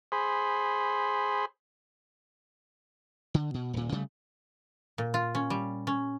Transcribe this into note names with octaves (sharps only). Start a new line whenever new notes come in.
G#4 C5 B5
D3
B2
D#1 A#2
C#3 G3 A3
A#2
F4
C#4
G3
C#4